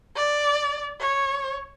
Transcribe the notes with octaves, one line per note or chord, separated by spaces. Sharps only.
D5
C#5